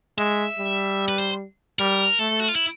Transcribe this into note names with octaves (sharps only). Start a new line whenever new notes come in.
G#3 E5
G3
B4
C5
G3 A#4
A3 A4
F#4
F4
E4